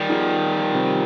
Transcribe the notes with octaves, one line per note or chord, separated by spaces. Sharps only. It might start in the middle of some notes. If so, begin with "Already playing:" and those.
Already playing: D#3 G3
F3 B3 D#4 G#4
C3 F3 C4 G4